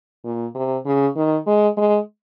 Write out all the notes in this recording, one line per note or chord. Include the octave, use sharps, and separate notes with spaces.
A#2
C3
C#3
D#3
G#3
G#3